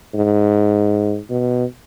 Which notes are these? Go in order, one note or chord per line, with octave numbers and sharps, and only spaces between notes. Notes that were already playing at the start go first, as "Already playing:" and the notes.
G#2
B2